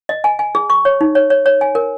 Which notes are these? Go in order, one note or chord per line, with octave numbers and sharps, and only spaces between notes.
D#5
G#5
G#5
G#4
C#6
C#5
D#4
C#5
C#5
C#5
G#5
A#4